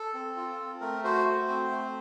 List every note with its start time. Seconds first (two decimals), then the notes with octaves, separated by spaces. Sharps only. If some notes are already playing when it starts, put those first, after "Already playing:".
Already playing: A4
0.14 C4
0.36 F4
0.59 C4
0.81 A3 A#4
1.04 F#4 C5
1.25 A3
1.48 C4
1.71 A3